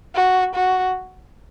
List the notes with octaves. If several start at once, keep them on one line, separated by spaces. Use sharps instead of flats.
F#4
F#4